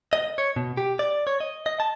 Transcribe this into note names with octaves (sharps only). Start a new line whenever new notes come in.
D#5
C#5
B2
G4
D5
C#5
D#5
D#5
A5